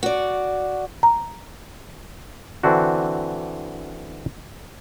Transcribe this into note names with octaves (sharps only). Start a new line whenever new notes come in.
F#4 D5
A#5
D3 E3 C4 D4 F#4